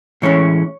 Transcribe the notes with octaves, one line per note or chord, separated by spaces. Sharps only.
A2 E3 G#3 C#4 C#5